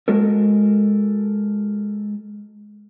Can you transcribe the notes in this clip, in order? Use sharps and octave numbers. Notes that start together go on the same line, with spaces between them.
G#3 F#4 A4 A#4